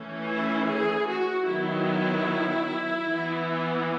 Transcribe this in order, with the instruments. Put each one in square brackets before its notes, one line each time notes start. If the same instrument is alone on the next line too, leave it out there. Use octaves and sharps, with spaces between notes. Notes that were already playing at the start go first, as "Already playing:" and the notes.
Already playing: [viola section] E3 A3 C#4
E4
G#4
F#4
D#3 F#3 B3 E4
E3 B3